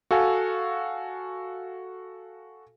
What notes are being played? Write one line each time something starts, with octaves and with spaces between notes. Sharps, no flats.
F#4 A4 F5 G#5